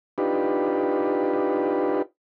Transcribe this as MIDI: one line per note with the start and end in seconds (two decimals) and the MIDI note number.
0.18 2.02 62
0.18 2.02 63
0.18 2.02 65
0.18 2.02 67
0.18 2.02 71